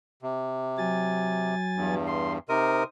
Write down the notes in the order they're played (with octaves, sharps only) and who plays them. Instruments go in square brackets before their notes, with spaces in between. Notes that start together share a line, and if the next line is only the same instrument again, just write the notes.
[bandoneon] C3
[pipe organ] F#3 G#5 A6
[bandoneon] E2 G2
[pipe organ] C6
[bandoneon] C3 A#4 [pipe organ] D#4 C5 D#6